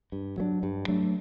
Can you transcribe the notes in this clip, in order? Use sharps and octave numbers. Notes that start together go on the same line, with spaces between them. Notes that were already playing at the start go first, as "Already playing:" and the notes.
G2
F#3 A3 D4
G2
F#3 A3 D4